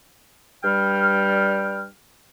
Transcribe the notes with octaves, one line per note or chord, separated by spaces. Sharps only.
G2 G3 G5 F6